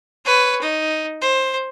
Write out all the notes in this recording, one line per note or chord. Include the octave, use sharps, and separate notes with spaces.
B4 C#5
D#4
C5